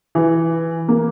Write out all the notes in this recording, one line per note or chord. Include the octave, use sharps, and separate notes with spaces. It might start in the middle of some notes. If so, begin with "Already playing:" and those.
E3
A#3